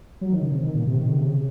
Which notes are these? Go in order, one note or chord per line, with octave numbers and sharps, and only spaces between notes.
F#3
D#3
C#3
C3
D#3
A#2
C3
D#3
C#3
C3
C#3